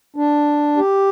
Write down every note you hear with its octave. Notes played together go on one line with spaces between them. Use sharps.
D4
G4